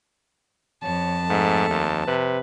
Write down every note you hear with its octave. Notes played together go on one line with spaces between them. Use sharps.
F2 C#5 A5
G#2 A3
D#2
C3 B4